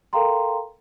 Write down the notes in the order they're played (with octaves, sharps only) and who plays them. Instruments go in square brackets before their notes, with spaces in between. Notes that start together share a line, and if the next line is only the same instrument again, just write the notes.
[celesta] A4 A#4 F5 G5 A#5 C6